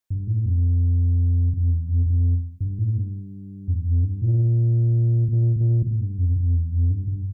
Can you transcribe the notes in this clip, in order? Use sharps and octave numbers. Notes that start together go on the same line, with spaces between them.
G2
A2
F2
F2
E2
F2
F2
G2
A2
G2
E2
F2
G2
A#2
A#2
A#2
A2
G2
F2
F2
E2
F2
G2
G2